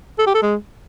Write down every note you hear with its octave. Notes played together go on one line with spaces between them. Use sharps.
A4
G4
A4
G#3